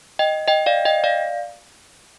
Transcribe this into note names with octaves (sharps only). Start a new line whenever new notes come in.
D#5 G5
D#5 G5
D5 F5
D#5 G5
D5 F5